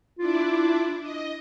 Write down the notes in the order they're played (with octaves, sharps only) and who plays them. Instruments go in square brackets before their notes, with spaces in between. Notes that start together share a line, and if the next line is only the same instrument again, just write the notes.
[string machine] D4 E4 D5 [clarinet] F4
[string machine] D#5